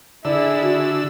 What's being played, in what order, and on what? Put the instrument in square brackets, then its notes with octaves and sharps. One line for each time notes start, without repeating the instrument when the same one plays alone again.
[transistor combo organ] D3 E6 [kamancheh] E4 G#4 [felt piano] D5
[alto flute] F#4